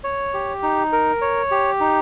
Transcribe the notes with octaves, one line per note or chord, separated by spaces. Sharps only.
C#5
G4
D#4
A#4
C#5
G4
D#4